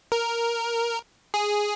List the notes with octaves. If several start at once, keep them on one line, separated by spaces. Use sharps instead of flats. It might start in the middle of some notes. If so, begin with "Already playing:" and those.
A#4
G#4